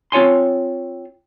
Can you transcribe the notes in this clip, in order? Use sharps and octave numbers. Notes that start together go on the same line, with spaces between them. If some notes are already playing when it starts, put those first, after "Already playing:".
C4 F4 C#5 G#5 C6